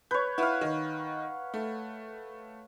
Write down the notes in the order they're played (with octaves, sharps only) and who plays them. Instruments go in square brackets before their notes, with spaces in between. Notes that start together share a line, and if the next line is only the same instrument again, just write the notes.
[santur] B4 C#5 [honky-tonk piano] G6
[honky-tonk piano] E4 B4 [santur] F5 F#5
[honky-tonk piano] D#3
A3